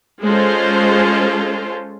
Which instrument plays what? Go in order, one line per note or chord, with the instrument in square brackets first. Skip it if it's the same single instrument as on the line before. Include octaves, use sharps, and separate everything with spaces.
[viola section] G#3 C#4 F4 A4 C5